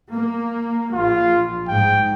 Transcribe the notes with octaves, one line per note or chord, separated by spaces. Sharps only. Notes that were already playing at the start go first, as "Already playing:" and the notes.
A#3
A#1 F4
G#2 G5